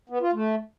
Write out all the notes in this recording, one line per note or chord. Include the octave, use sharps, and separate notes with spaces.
B3
F4
A3